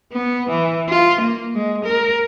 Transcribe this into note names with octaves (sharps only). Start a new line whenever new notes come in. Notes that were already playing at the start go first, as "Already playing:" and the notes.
B3
E3
F4
A#3
G#3
A#4